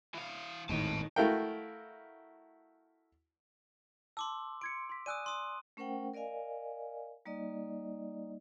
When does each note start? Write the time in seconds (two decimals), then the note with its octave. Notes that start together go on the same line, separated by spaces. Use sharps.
0.14 E3 F5
0.69 G#1 E2 A2 D#3 D#5 A5
1.16 A3 E4 F#4 A#4 F5 G5
4.17 A5 C6 D6 E6
4.61 C6 G#6 C#7 D7
4.89 C6 B6
5.06 D5 G#5 D#6 E6 F#6 D#7
5.26 C6 D#6
5.77 A3 C#4 A#4 C5 F#5 G5
6.13 A#4 D5 D#5 F5 G#5
7.26 G3 A#3 D#4 D5 D#5